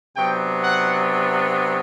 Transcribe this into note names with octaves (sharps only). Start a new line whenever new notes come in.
C3 F#3 B3 D4 G5
F#5